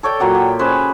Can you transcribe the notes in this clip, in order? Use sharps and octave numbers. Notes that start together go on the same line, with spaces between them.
A4 C#5 D5 G5
A#2 F#3 G4 F#5
G4
C#4 G#4 B4 C5